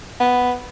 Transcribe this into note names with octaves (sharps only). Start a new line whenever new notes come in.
B3